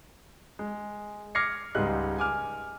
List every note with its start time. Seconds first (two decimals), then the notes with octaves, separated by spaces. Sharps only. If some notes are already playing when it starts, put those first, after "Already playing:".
0.59 G#3
1.35 D6 F6 G#6 A#6 C7 C#7
1.75 C#2 G#2 G3 D#4 G#4 F#6
2.18 G#5 D6 F6